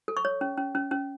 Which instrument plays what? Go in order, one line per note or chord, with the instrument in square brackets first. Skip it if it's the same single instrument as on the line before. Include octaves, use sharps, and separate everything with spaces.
[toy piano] A4
C#6
C#5
C#4
C#4
C#4
C#4